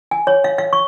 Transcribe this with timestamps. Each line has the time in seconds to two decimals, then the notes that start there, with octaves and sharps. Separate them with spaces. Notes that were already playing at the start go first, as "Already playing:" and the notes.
0.11 G#5
0.27 C#5
0.44 F5
0.58 F5
0.73 C#6